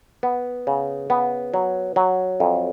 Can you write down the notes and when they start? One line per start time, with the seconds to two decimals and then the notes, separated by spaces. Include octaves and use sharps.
0.23 B3
0.67 C#3
1.10 B3
1.54 F#3
1.96 F#3
2.40 F2